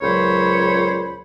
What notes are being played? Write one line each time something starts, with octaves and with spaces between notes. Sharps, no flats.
C#2 A#2 F#3 C5 C#5 B5